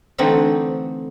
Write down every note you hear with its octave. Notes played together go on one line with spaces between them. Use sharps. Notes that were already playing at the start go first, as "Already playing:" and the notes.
D3 E3 A3 C4 D4 D#4